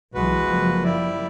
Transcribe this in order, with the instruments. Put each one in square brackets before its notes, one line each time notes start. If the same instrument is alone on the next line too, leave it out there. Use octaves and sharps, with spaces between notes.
[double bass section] B1 E3 [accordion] G#3 F#4 B4
[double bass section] F#1 F3 A#3
[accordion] G3 E4 D5